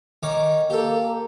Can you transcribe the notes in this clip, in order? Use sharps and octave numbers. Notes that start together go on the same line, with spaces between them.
D#3 C#4 D6
A#3 G4 A4